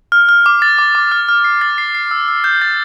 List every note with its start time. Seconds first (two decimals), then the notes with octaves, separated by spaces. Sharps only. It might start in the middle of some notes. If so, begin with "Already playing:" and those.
0.12 F6
0.29 F6
0.46 D6
0.62 A6
0.78 D6
0.95 D6
1.12 F6
1.29 F6
1.44 C7
1.61 A6
1.78 C7
1.95 C7
2.11 E6
2.28 E6
2.44 G6
2.62 A6